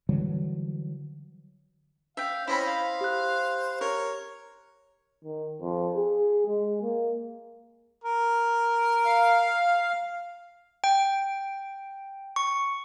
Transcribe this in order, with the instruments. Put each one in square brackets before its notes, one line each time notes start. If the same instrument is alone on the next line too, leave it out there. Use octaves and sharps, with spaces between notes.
[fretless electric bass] D3 E3 F#3 G3
[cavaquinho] E5 G5 [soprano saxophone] F5
[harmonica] C4 C#4 C5 [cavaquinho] E4 D#5 B5
[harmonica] C5 [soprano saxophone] F5
[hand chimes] G4 F#6
[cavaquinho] A#4 [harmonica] C#5
[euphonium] D#3
F2
G#4
G#3
A#3
[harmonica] A#4
[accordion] F5
[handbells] G5
C#6